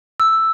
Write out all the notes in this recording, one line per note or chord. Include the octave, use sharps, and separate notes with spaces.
E6